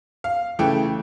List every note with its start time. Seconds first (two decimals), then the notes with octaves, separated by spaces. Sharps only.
0.24 F5
0.59 C#3 E3 A3 G5